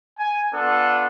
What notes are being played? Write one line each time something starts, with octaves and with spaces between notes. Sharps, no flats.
G#5
B3 D4 F4 A4